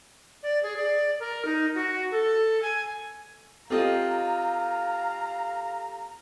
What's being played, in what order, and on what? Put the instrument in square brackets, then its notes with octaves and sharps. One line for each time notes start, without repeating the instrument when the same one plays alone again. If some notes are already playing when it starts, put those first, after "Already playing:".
[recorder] D5
G#4
D5
A#4
D#4
F#4
A4
G#5
[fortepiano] C4 F4 D#5 [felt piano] G4 A4 [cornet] F5 [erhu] A#5